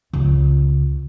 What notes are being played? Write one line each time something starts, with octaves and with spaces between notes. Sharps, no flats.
C#2